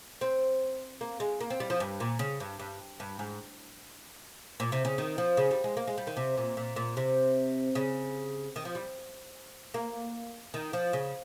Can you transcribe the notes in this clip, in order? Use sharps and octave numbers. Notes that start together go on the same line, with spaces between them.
C4
A#3
G#3
A#3
C4
G3
F3
G2
A#2
C#3
G2
G2
G2
G#2
A#2
C3
C#3
D#3
F3
C#3
G3
G#3
A#3
G#3
G3
D#3
C3
A#2
A#2
A#2
C3
C#3
D#3
F3
G3
A#3
D#3
F3
C#3